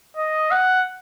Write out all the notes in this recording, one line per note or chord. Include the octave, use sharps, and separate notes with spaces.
D#5
F#5